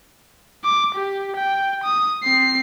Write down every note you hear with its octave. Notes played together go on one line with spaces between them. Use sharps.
D6
G4
G5
D#6
C4 C7